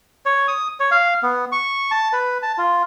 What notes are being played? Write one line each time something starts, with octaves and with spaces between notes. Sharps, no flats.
C#5
D#6
C#5
F5
B3
C#6
A5
B4
A5
F4